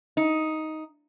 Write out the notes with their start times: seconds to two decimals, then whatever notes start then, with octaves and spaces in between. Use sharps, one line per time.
0.17 D#4